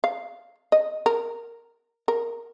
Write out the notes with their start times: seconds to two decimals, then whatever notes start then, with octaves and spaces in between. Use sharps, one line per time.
0.04 F5
0.72 D#5
1.06 A#4
2.08 A#4